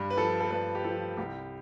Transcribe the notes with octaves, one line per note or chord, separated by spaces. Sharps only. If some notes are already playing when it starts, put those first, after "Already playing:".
Already playing: G2
B4
F3 A4
A4
G2 B4
G4
F3 A4
C2 G4